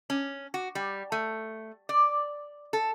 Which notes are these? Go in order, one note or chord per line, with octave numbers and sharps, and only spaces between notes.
C#4
F#4
G3
A3
D5
A4